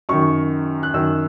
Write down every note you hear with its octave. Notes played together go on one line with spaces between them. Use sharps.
F#2 D#3 C#6
F#6
F#2 D#3 E6